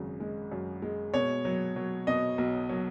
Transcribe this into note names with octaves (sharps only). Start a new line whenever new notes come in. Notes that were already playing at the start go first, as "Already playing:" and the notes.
Already playing: G#1 F#2 C#3
G#3
F#2
G#3
B2 C#5
F#3
F#3
B2 D#5
B1
F#3